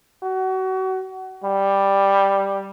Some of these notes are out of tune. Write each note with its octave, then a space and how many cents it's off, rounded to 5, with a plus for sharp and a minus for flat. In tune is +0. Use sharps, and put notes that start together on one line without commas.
F#4 +30
G3 +5